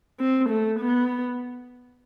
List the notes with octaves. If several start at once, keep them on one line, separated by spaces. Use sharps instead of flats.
C4
A3
B3